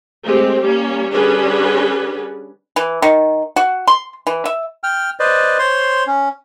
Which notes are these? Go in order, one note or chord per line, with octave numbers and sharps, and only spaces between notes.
G#3 A3 C4 G4
G3 A#3 C#4
D3 G3 C#4 D4 G#4 B4
E3
D#3
F#4
C6
E3
E5
G5 F6
B4 C5 D5 D#5
C5 C#5 C6
C#4